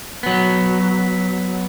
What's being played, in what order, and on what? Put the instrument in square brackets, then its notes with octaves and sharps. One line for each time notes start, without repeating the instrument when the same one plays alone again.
[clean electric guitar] F#3 B3